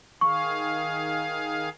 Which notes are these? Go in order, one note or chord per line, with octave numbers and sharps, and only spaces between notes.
D#3 G#4 F5 C#6